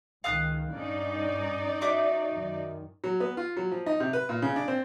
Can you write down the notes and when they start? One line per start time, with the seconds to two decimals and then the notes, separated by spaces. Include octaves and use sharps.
0.24 C#2 D#3 F5 D#6 F#6
0.74 G2 C#4 D#4 D5
1.81 F#4 E5 D6
2.29 F#2 D#3
3.04 F#3
3.20 B3
3.37 F4
3.57 F#3
3.71 F3
3.86 D#4
4.00 C3
4.13 B4
4.29 A#2
4.42 C#3
4.56 D4
4.68 C4